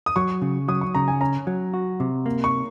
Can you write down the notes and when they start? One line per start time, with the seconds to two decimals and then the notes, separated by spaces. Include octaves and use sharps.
0.06 D#6
0.16 F#3 C#6
0.42 C#3
0.68 F#3 D#6
0.81 C#6
0.95 C#3 A#5
1.08 G#5
1.21 C#4 A#5
1.47 F#3
1.74 F#4
2.00 C3
2.26 A#3
2.44 C#6